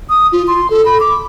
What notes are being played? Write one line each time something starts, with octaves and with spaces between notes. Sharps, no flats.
D#6
F4
C6
A4
B5
D6